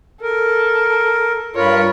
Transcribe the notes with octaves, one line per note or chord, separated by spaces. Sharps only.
A4 A#4
G2 F4 A#4 C#5 B5